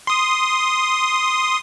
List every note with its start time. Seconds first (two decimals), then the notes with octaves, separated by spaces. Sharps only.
0.07 C6 D#6